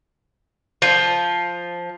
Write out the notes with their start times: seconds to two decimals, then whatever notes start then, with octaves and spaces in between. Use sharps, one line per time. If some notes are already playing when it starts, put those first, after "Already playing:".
0.82 F3